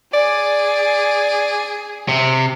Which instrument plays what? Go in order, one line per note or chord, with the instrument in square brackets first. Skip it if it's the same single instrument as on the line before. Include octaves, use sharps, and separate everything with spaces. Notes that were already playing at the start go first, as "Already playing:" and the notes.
[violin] G#4 [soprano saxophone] D5
[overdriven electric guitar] C3